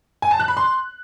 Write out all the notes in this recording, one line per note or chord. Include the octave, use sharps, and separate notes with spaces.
G#5
A5
F#6
B5
C6